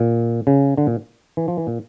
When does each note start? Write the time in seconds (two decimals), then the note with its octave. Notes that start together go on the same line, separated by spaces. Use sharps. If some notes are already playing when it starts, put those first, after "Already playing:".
Already playing: A#2
0.47 C#3
0.77 D3
0.87 A#2
1.37 E3
1.48 F3
1.58 E3
1.67 A#2